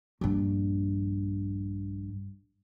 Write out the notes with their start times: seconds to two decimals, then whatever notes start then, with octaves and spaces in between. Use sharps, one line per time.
0.21 A#1 G2